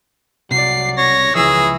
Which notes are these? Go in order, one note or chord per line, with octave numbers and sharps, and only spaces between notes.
C2 C3 F#3 D5 C7
C#5 A#6
C#2 E3 F3 G#4 E6